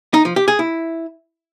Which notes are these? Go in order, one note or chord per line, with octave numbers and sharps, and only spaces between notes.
D#4
F3
G4
G#4
E4